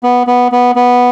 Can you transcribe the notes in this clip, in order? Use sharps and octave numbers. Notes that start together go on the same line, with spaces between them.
B3
B3
B3
B3